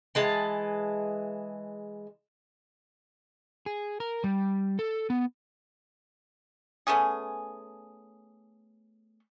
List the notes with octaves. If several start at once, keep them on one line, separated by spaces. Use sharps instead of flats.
E3 G#3 A5
G#4
A#4
G3
A4
B3
A3 B3 C#4 G#4